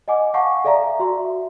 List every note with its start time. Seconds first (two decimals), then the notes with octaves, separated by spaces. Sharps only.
0.08 D#5 F#5 G#5 D6
0.34 F5 F#5 G#5 A5 C#6
0.65 A4 D5 E5 F5 A#5
1.00 F#4 E5 C6